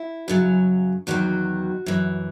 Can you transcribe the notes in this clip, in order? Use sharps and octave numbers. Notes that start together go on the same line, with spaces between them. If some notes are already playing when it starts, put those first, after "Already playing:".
Already playing: E4
F#2 C#3 F#3
E2 D#3 F#3 F#4
F#2 E3